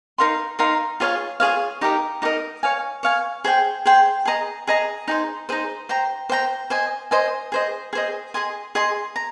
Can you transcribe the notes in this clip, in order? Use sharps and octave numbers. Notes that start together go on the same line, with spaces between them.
D#4 A#4 F5 C6
D#4 A#4 F5 C6
F4 G#4 C#5 F5
F4 G#4 C#5 F5
D#4 G4 A#4 D#5
D#4 G4 A#4 D#5
C#5 F5 G#5
C#5 F5 G#5
G#4 C5 G5
G#4 C5 G5
G#4 D#5 A#5
G#4 D#5 A#5
D#4 G#4 C5
D#4 G#4 C5
C5 G5 A#5
C5 G5 A#5
C5 D#5 G#5
C5 D#5 G#5
G#4 C5 D#5
G#4 C5 D#5
G#4 D#5 G#5 C6
G#4 D#5 G#5 C6
A#5